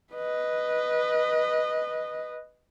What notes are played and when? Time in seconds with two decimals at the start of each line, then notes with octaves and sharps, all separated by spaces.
0.14 B4 D#5